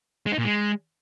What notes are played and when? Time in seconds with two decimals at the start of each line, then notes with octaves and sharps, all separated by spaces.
0.26 G#3
0.32 D#4
0.38 A#2
0.44 G#3